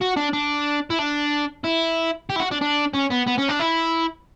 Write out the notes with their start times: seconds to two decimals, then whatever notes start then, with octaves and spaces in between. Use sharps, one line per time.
0.01 F#4
0.16 D4
0.33 D4
0.90 E4
0.99 D4
1.64 E4
2.30 G4
2.36 E4
2.40 F#4
2.51 D4
2.62 D4
2.95 C#4
3.11 B3
3.28 B3
3.39 C#4
3.49 D4
3.60 E4